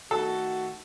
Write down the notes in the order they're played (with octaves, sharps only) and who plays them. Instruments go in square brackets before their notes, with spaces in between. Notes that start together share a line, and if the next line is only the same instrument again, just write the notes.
[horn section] D#3 A3 F#4 [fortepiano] A4